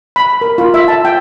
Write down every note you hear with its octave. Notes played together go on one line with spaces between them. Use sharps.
B5
A#4
F4
E5
A5
G5